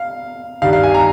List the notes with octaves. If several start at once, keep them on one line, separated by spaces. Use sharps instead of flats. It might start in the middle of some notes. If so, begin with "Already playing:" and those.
Already playing: F5
G2 D#3 G3 F5
F5
G#5
A#5